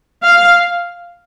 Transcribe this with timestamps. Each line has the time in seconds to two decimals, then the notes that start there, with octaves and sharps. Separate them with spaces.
0.25 F5